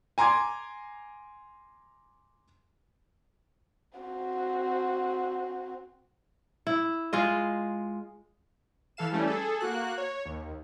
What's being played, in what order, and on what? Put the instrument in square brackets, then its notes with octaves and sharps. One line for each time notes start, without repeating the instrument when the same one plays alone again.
[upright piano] G#5 A#5 C6 D6 G#6
[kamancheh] C4 F#4
[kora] E4
G#3 F4 D#5
[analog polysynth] E3 A4 F5 E7
E3 G3 A3 C#4
G#4 A4
A#3 F#4 F#6
C#5
D#2